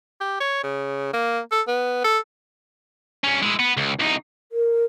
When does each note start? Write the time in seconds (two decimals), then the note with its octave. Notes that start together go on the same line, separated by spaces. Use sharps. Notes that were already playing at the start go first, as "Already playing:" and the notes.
0.20 G4
0.40 C#5
0.63 C#3
1.13 A#3
1.51 A4
1.68 B3
2.04 A4
3.24 G2 C#4
3.42 G#3 E4
3.59 B3
3.77 C#2
3.99 C2 D#4
4.52 A#4